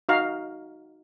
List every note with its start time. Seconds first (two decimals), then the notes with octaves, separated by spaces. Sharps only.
0.09 D#4 F#4 F5 A#5